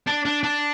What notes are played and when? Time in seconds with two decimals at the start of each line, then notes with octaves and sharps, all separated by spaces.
0.07 D4
0.25 D4
0.43 D4